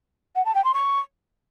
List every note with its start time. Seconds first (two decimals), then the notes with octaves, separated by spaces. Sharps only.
0.36 F#5
0.45 A5
0.55 G5
0.64 C6
0.74 C#6